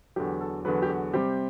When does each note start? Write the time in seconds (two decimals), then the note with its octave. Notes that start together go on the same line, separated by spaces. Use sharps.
0.16 E2 D3 F#3 G4
0.41 A4
0.65 E2 D3 F#3 B4
0.82 G4
0.89 F#4
1.14 C3 G3 C4 G4